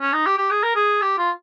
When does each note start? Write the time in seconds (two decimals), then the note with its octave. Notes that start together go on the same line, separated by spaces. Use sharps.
0.01 C#4
0.13 D#4
0.26 G4
0.38 G4
0.51 G#4
0.63 A#4
0.76 G#4
1.02 G4
1.18 F4